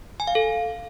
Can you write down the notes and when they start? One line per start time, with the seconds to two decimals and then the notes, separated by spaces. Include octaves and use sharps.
0.20 G#5
0.27 F5
0.35 A4